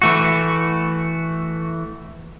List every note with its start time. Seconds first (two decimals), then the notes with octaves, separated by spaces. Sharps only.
0.02 E3 A3 F#4